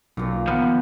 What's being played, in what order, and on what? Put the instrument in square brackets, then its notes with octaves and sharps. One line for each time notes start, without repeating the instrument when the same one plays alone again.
[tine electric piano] B1 [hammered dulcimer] F#2 A#2
[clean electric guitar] D#3 F3 [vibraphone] B3 [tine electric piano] F#5 B5